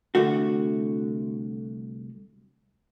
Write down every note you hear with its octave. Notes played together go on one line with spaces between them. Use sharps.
C2 D3 A3 F#4